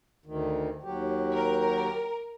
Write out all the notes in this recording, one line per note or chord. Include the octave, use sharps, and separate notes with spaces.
D2 D#3
D#2 F#3 G4
A#4